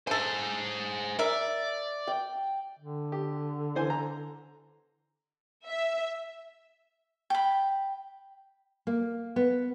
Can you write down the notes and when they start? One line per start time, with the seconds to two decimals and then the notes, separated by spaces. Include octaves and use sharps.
0.07 C#3 G#4 A4 C5
1.19 A#4 D5 E5
2.07 G5
2.79 D3
3.12 G4
3.75 E3 C5 G#5
3.90 A#5
5.66 E5
7.30 G5 B5
8.87 A#3
9.36 B3